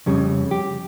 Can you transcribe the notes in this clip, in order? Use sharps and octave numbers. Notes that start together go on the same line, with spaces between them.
F2 C#3 G3
G4